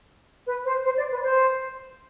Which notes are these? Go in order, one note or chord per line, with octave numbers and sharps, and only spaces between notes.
B4
C5
C5
D5
B4
C5